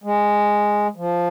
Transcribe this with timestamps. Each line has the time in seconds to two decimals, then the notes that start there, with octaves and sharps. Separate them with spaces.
0.04 G#3
0.96 F3